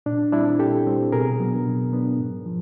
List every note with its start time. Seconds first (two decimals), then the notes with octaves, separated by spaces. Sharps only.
0.06 A#2 D4
0.32 G3 C4 D4 E4
0.59 A#2 G4 A4
0.87 G3 C4
1.12 B2 G#4 A#4
1.40 F#3 B3 D4
1.66 B2
1.92 F#3 B3 D4
2.20 G#2
2.46 F3